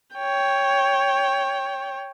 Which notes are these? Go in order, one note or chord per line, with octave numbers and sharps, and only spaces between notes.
C#5 G5